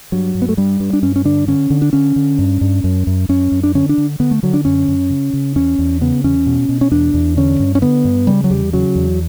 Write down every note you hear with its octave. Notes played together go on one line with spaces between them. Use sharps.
G2 F#3
G2
B3
A3
G2 G3
G2
D4
G2 C#4
C#4
D3 D4
D3 C#4
D3
D4
D3 C#4
D3
G2
G2
F#2
F#2
F#2 C#4
F#2
D4
D3 C#4
D4
D3
D3 B3
A3
D3 F#3
D4
F#2 C#4
F#2
C#3
C#3
E2 C#4
E2
C#3 B3
E2 C#4
B2
B2
C#4
E2 D4
E2
D3 C#4
G2
C#4
D3 B3
G2
C#3 G3
F#3
E2 G3
C#3 F#3
E2